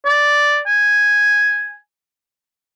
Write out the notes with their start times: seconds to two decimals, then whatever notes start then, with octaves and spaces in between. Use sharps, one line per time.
0.06 D5
0.67 G#5